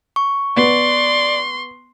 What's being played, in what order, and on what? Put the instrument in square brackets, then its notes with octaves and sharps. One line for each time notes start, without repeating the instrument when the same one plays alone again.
[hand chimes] C#6
[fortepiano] B3 [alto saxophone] D5 [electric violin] C6